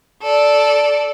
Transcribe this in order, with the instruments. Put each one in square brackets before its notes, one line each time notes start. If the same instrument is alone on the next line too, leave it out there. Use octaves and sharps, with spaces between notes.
[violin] A4 D5